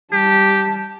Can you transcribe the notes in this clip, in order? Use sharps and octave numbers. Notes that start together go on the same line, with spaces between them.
G3 G4 A5